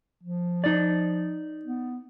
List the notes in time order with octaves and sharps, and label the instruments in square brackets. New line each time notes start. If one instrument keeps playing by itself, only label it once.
[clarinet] F3
[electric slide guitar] D#4 D5
[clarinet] B3